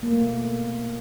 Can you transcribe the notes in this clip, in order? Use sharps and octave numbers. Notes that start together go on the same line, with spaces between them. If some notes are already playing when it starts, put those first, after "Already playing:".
A#3
A3
B2